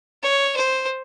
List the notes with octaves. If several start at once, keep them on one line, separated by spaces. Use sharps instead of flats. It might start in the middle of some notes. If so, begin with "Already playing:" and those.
C#5
C5